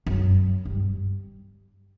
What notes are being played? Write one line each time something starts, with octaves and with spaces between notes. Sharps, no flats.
F#2
G2